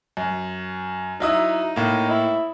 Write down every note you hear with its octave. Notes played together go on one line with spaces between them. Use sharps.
F#2
F#3 D#4 E4 D#6
A2 A#3
E4